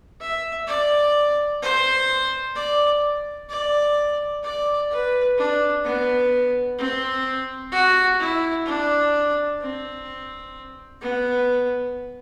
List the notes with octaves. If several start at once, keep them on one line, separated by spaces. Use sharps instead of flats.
E5
D5
C5
D5
D5
D5
B4
D4
B3
C4
F#4
E4
D4
C4
B3